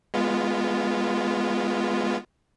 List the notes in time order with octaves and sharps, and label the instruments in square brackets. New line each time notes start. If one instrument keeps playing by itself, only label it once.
[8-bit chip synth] G#3 B3 F4